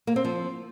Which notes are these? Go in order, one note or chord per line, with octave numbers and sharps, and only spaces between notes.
A#3
C4
F3